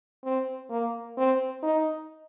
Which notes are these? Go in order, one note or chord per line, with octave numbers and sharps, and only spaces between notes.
C4
A#3
C4
D#4